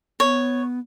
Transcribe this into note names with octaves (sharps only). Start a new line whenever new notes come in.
B3 C#5